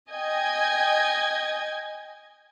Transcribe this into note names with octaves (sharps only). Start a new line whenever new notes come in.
D#5 G5 G#5 G#6